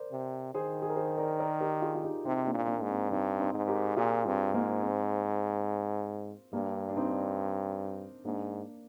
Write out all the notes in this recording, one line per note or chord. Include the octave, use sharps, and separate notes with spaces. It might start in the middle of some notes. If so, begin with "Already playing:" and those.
Already playing: A#4 C5 D5
C3
D#3 G#4 C5
G#4
A#4
G#4 C5
A#4 D5
A#4 D5
G4 A#4
F4 G#4
F4
D#4 G4
C3 C4 D#4
A#3 D4
A#2
A#3 D4
G#2
C4
D4
G2 C4 D#4
C4 D#4
G#2
G4 A#4
A#2 F4 G#4
G2 C4
G#2 A#3
C4
G2 A#3 D4
D4
C4 D#4
G#2 A#3 D4